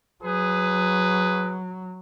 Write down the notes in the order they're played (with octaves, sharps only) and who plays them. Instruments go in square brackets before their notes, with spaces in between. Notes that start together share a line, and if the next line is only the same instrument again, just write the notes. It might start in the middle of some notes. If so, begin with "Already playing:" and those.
[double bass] F#3 [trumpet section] G#4 B4